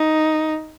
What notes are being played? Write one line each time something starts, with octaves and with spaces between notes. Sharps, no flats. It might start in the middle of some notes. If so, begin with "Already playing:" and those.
Already playing: D#4